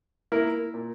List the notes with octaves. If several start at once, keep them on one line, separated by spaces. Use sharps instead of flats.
A#3 E4 A#4
A#2